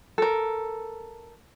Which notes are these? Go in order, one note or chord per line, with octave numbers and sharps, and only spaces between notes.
A4 A#4